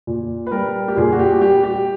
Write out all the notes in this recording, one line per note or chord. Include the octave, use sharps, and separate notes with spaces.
A#2
B4
G3 A#4
G4
A#2 G#4
F#4
G4
G3 G4
G4